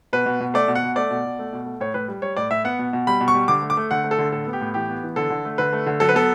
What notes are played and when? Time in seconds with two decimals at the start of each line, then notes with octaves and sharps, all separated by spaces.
0.13 B2 B4
0.26 B2
0.40 B2
0.54 A3 D5
0.68 B2
0.75 F#5
0.83 B2
0.96 A3 D5
1.11 B2
1.25 B2
1.39 A3
1.53 B2
1.66 A3
1.81 A2 C#5
1.94 A2 B4
2.08 G3
2.22 G3 C#5
2.37 A2 D5
2.51 A2 E5
2.64 B3 F#5
2.79 B2
2.93 B2
3.07 G3 B5
3.21 B2
3.28 C#6
3.34 G3
3.48 D3 D6
3.62 A3
3.70 D6
3.77 A3
3.91 D3 F#5
4.04 A3
4.11 A4
4.19 D3
4.32 A2 A4
4.47 B3
4.53 G4
4.61 A2
4.74 E3 G4
4.89 B3
5.03 E3
5.16 D3 A4
5.30 D3
5.45 A3
5.58 D3 B4
5.73 A3
5.86 D3
6.00 F#3 A4
6.09 B4
6.15 B3 A4